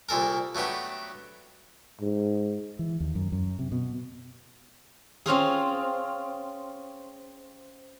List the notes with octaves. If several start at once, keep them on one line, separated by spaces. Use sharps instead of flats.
C2 A#2 A4 A#4
F#3 A3 B3 D4 G4
G#2
E3
D#2
F#2
F#2
C3
B2
C4 C#4 F4 G#4